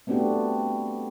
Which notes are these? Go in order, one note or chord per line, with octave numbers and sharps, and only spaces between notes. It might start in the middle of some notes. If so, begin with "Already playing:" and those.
A3 B3 C4 D4 F#4 G4